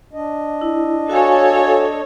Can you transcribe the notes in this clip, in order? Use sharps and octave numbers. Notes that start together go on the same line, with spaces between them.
D4 D#5
E4
F#4 A4 C#5 F5 G#5